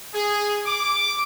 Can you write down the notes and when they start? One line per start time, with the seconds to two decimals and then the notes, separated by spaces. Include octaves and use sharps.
0.14 G#4
0.66 D6